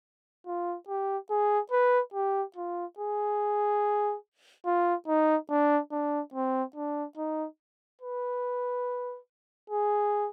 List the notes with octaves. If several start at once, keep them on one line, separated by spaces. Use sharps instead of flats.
F4
G4
G#4
B4
G4
F4
G#4
F4
D#4
D4
D4
C4
D4
D#4
B4
G#4